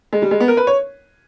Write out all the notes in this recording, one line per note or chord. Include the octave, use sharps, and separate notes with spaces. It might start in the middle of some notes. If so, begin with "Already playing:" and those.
G#3
G3
G#3
B3
A#4
B4
C#5